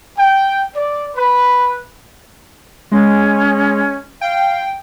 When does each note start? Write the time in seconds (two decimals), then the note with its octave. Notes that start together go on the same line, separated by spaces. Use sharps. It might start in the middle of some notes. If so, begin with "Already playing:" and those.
0.18 G5
0.76 D5
1.16 B4
2.92 G#3 C#4
4.21 F5 G5